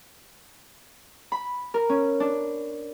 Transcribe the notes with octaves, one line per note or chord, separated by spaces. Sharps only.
B5
A#4
C#4
D4